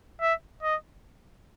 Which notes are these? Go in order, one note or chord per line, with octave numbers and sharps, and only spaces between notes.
E5
D#5